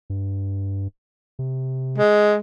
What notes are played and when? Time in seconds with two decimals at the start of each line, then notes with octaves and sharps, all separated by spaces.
0.10 G2
1.39 C3
1.98 G#3